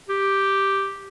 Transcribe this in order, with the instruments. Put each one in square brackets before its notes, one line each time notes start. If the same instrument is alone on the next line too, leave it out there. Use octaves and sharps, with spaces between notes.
[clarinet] G4